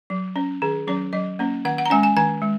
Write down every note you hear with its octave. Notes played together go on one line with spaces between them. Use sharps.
F#3
C#4
D#3 G#4
F#3 C#4 C#5
F#3 D#5
A#3 C#4
D#3 F#5
F#5
A#5
G#3 C#4 G#5
G#5
D#3 G#5
G#3